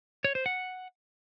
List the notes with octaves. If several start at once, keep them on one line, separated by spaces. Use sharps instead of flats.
C#5
C5
F#5